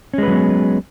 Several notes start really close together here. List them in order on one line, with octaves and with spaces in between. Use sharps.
C#4 G#3 B4 F#3 B3